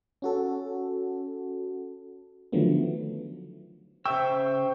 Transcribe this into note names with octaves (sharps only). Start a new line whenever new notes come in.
C#4 F#4 A4
D3 D#3 F3 F#3 A3 B3
C#3 C5 E5 G5 C#6 E6